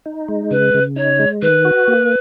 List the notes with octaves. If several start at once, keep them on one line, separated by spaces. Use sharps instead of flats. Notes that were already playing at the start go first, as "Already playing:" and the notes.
D#4
G#3
C#3 B4
C#3
D#4 C#5
G#3
D#3 B4
F#4
A#3